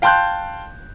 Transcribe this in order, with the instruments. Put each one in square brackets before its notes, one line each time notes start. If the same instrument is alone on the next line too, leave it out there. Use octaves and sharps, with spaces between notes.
[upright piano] F5 G5 A5 C6 F#6 G6